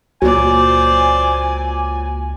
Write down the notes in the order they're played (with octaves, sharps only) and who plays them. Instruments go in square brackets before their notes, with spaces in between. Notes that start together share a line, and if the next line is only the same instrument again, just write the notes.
[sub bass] C#2 [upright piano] A#2 F#3 [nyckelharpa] C5 D5 [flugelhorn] G#5